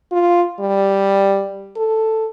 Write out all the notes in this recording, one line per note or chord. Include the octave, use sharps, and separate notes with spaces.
F4
G3
A4